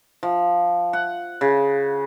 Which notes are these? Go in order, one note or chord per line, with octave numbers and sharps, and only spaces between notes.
F3
F#5
C#3